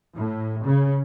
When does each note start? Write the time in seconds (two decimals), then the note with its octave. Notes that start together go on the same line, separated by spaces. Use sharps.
0.15 A2
0.65 C#3